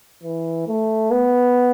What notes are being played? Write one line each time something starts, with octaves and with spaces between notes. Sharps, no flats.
E3
A3
B3